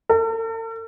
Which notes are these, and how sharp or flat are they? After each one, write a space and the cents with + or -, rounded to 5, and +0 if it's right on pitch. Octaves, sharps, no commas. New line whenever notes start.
A4 +45